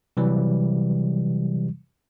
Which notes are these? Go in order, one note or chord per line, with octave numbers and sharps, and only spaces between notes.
C3 E3 F#3 G3